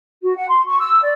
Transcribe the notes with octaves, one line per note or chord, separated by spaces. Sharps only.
F#4
F#5
C6
C#6
E6
D5